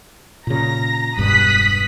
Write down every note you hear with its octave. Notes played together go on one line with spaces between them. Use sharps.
A#2 C#3 A#5 A#6
E1 G2 B2 D#6 F#6 B6